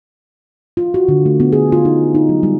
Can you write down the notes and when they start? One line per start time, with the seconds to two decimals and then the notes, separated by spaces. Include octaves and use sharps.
0.77 F4
0.94 F#4
1.08 D3
1.26 A3
1.40 B3
1.53 G#4
1.72 F4
1.85 D#4
2.15 D#4
2.29 F#3
2.43 G3